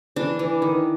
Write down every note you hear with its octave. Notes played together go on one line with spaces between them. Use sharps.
E3 D4
E3
D#3